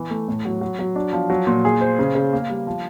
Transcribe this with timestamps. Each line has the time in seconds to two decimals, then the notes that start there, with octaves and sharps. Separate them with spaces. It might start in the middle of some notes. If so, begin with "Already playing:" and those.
Already playing: E3
0.11 A3
0.28 A2
0.45 F#3
0.61 F#3
0.79 F#3
0.95 D4
1.13 F3
1.30 F#3
1.47 A#2
1.65 G#4
1.81 C5
1.99 C#3
2.15 C#3
2.33 A#3
2.50 G3
2.67 F3